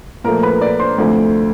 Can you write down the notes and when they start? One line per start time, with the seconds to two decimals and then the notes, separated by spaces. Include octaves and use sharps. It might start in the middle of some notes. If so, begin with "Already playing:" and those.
0.24 A#2 F3 A3 A#4 A#5
0.43 B4 B5
0.61 D5 D6
0.80 C5 C6
0.98 D2 C3 F3 A3